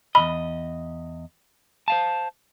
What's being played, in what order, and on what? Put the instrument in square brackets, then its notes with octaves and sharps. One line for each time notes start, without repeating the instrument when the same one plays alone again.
[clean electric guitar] E2 C3 D#5 [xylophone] B5
[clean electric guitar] C5 F5 A5